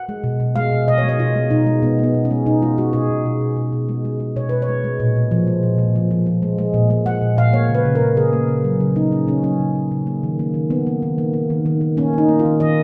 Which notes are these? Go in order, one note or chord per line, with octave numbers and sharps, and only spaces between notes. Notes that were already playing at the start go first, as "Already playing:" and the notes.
Already playing: F#5
G#3
B2
B2
G#3 F5
B2
B2 D#5
C#5
G#3
D#5
B2 F4
G#3
B2 D#4
G#3
B2 B3
G#3 B3
B2
C#4
G#3
B2 D#4
G#3 F4
G#3 F#4
B2 G#4
B2
B2
B2
B2
B2
G#3
G#3
G#3
B2 C#5
B2 B4
C#5
G#3
G#3
A#2
A#2
F3
G#3
A#2
A#2
F3
F3
F3
G#3
G#3
A#2
G#3
G#3 F#5
A#2
A#2 F5
A#3 C#5
C#3
B4
C#3
A#4
C#3
C#3 G#4
A#3
C#3
F#3
C#3
A#3 D#4
C#3 C#4
C#3 C#4
F#3 C#4
C#3
C#3
C#3
A#3
D#3
A#3
D#3
A#3 B3
A#3
D#3
A#3
A#3
D#3
D#3
D#3
A#3 C#4
A#3 D#4
A#3
F4
D#3
D#3 D#5